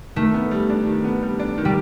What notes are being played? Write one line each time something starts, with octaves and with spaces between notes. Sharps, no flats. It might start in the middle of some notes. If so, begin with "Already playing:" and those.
D#3 A3
B3
G3
D4
D#3
B3
G3
D4
D#3
G3